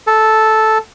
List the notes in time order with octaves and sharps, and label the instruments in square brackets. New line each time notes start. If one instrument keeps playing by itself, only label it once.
[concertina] A4